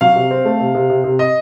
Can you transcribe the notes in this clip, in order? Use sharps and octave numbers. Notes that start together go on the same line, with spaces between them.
F#3 F5
C3
C4
A3
C3
C3
C3
C3
D#5